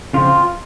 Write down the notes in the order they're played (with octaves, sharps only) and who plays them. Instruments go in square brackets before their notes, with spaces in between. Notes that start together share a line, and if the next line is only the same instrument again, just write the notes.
[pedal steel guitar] C#3 F3 C4 F4